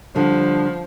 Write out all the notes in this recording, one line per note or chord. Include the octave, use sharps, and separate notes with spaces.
D3 F3 G3